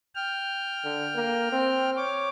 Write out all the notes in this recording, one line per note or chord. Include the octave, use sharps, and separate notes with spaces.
G5 F6
D3
A#3
C4
C#5 D6